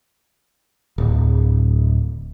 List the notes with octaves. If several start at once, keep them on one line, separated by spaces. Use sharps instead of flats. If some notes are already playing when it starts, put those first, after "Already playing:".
D1